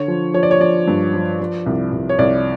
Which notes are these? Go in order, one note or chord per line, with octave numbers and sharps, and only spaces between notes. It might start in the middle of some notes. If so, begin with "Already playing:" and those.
Already playing: D3 C#5
F3
F3 C#5
D5
C#5
F3 D5
G2
F3
F3
C2
C2
C#5
C2 D5